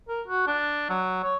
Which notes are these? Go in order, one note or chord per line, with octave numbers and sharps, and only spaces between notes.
A#4
F#4
D4
F#3
C#5